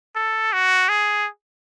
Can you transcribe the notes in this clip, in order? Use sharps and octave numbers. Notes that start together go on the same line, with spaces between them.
A4
F#4
G#4